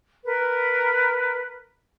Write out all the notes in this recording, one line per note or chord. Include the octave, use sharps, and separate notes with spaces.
A#4 B4